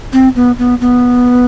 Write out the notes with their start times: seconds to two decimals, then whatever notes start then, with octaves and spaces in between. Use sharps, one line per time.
0.13 C4
0.36 B3
0.59 B3
0.81 B3